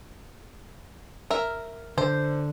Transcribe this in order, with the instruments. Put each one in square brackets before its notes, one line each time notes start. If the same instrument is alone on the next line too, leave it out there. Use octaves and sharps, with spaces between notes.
[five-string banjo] A#4 E5
[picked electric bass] D3 [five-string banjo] C5